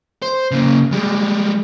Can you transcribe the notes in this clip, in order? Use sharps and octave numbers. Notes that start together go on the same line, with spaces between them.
C5
C#3 A#3
G3 G#3